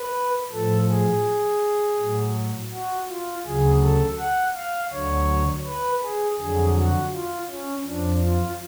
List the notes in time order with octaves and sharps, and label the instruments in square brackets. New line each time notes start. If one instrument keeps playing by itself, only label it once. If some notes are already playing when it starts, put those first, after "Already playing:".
Already playing: [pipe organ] B4
A2 F3 A4
G#4
A2 F#3
F#4
F4
D2 C#3 F#3 G#4
A4
F#5
F5
D2 D3 F#3 C#5
B4
G#4
F2 D3 F#3 G#4
F#4
F4
C#4
F2 F3 D4
F4